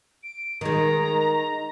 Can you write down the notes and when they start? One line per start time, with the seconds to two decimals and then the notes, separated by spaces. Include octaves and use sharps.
0.23 D7
0.61 D#3 G#3 A#5